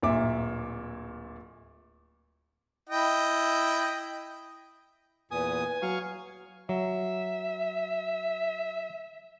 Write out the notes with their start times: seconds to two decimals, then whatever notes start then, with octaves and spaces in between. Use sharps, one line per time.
0.03 D1 A#2 E5 D6
2.89 E4 D#5 G5
5.31 E2 A#2 B4 G#5 D#6
5.82 F#3 F5 C#6
6.69 F#3 E5